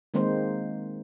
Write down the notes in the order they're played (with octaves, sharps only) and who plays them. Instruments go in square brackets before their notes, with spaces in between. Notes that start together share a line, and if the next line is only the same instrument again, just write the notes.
[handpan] D#3 G#3 A#3 C4 D#4 C5